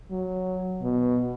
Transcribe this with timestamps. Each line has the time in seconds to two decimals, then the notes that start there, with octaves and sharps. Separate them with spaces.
0.11 F#3
0.82 B2